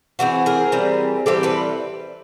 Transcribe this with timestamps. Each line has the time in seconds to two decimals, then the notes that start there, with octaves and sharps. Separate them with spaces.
0.19 E3 G3 C4 F#4 G#4
0.46 G#4 A#4
0.72 E3 G3 C4
1.26 E3 G3 C4 G4 A4
1.43 A4 B4